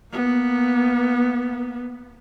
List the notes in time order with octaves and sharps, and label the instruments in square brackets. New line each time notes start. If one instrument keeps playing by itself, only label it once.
[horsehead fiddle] A#3 B3